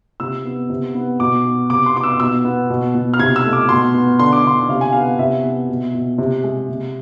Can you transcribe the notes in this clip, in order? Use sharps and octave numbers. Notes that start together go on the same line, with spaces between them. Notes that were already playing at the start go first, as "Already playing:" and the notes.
C3 E6
B3
C3
B3
B2 D6
B3
C3 D6
C6
B3 D6
E6
B2 E6
B3
B2
B2
F6
C3 G#6
E6
A3
D6
B2 C6
B3
D3 C6
D6
D3 C6
C3 F5
G#5
B3 F5
C3 E5
B3
B2
B2
C3
G#3
C3